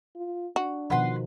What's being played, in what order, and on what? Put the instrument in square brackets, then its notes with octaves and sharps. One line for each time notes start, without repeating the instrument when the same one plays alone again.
[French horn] F4
[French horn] D4 [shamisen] F#4
[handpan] B2 D#3 F3 [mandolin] B4 F#5 C6